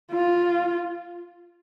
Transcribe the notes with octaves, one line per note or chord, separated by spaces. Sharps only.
F4